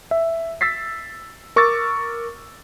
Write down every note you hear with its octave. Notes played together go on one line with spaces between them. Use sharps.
E5
E6 A6 B6 C7
A#4 C#6 D6 E6 A6